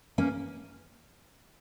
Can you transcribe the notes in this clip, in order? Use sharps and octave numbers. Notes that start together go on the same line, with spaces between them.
A#3 C#4